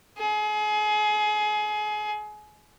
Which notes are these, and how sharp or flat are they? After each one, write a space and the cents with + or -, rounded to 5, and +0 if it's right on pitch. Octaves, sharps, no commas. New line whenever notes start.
G#4 +30